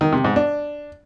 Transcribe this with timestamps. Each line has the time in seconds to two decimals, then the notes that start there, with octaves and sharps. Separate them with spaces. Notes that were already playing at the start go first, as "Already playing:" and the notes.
0.01 D#3
0.13 C3
0.24 G#2
0.36 D4